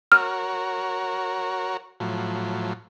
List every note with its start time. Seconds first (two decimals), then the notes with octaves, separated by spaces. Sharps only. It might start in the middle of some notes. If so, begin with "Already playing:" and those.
0.12 F#4 A#4 C#5 F6
2.00 A2 F3 F#3